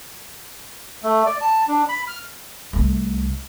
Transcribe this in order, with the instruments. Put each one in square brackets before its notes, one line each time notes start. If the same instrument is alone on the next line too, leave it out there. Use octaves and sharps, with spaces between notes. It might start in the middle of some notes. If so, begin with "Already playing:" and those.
[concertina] A3
D5
A5
D4
B5
F6
[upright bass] C2 A3